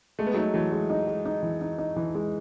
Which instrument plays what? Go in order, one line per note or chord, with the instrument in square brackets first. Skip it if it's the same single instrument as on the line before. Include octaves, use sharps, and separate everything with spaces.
[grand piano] G#3 [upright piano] A3
[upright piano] B3
[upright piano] F#3 A3 [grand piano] D#4
[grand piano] E3 [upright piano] F#3 A3
[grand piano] G#3
D#4
G#3
D#4
E3
D#4
D#4
E3
G#3